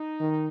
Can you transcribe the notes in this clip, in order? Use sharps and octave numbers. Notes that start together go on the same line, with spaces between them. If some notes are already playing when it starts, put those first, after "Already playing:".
Already playing: D#4
D#3